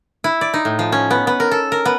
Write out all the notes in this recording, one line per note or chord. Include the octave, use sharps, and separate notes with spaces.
E4
D5
D#4
A2
F3
C#4
B3
B3
A#4
A4
A#4
B3